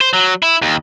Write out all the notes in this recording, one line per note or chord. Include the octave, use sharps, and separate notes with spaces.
C5
F#3
E4
D#2